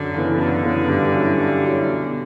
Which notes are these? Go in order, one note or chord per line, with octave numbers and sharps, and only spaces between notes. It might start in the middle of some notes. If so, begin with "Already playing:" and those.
Already playing: F#2 D3
C#3 E3 B3
F#2 D3
C#3 E3 B3
G2
F#3 C#4 E4
G2
F#3 C#4 E4
B2